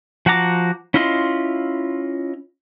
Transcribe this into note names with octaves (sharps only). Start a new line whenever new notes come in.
F3 F#4 F#5 A#5 D6
C#4 E4 F4 D#5 C6